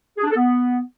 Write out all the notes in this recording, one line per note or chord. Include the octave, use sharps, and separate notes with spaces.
G#4
D4
A4
B3